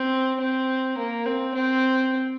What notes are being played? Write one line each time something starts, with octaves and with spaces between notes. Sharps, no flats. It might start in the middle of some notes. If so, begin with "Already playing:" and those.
Already playing: C4
C4
A#3
C4
C4